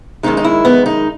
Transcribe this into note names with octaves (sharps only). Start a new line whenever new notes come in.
F#2 D#3 G#3 D#4
D#4
E4
B3
D#4